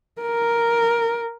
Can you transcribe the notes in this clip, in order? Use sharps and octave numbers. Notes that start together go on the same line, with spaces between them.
A#4